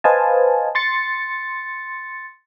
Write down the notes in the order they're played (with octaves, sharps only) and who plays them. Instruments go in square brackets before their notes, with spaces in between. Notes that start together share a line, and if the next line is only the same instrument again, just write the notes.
[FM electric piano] B4 C5 D#5 F5 G#5 A5
C6 A6 C#7